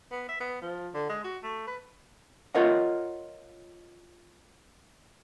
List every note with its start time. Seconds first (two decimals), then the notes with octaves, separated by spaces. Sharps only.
0.12 B3
0.29 E5
0.40 B3
0.62 F3
0.94 D3
1.09 G#3
1.24 F#4
1.43 A3
1.67 B4
2.55 F4 A#4 C#5 D#5 F#5